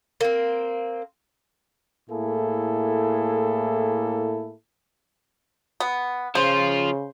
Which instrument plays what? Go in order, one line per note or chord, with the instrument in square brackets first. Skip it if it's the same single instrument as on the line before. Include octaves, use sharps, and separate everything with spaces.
[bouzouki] A#3 C4
[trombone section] A2 A#3 E4 G#4 A4
[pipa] B3
[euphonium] C#3 [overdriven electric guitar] F3 F4 [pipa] C5